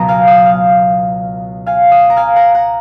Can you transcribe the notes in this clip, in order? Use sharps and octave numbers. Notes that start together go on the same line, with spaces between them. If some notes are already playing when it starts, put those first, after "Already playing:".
Already playing: C#2 B2 F#3 B3 A#5
F5 G#5
D#5 F#5
F5
F5 G#5
D#5 F#5
A#5
F5 G#5
F#5 A#5
F#5 A#5